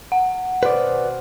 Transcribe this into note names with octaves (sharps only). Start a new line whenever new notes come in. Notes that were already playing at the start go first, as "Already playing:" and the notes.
F#5
B2 D#3 C4 B4 D5